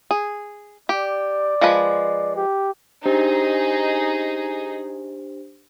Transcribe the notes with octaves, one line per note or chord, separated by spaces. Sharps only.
G#4
G4 D5
F3 G#3 B4
G4
D4 D#4 G4 G#4 C5